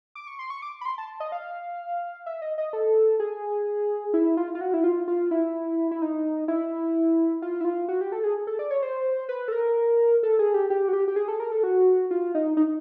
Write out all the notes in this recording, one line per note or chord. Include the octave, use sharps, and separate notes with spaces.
D6
C#6
C6
C#6
D6
B5
C6
A5
D#5
F5
E5
D#5
D#5
A4
G#4
E4
F4
F4
F#4
E4
F4
F4
E4
E4
D#4
E4
F4
E4
F4
F#4
G4
A4
G#4
A4
D5
C#5
C5
B4
A4
A#4
A4
G#4
G4
G4
F#4
G4
G4
G#4
A4
A#4
A4
F#4
F4
D#4
D#4